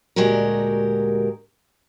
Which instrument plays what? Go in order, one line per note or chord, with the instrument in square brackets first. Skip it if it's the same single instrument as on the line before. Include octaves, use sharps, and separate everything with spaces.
[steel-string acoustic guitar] D2 A#2 G#3 F#4 G4 A#4